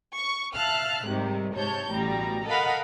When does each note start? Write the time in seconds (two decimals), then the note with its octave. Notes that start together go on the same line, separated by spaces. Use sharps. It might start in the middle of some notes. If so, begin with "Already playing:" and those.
0.16 C#6
0.55 E5 F5 A5 F6 F#6
1.06 G#2 C3 D#3 G3
1.54 G#2 C3 C#5 A5 G6
1.92 A1 B2 G3 A#5
2.46 A4 A#4 D#5 F5 F#5 B5